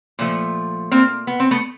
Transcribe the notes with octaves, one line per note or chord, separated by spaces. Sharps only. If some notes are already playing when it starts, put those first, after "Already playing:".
A#2 F3 A3
A#3 C4
B3
C4
A3 B3